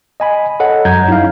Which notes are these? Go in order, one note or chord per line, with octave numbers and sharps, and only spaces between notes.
D#5 G#5 B5
A4 C#5 D#5 F#5
F#2 F#3 A#5 G6 G#6
D#4 E4 F5